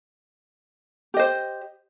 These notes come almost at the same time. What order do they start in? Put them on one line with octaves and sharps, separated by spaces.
G4 D#5 C5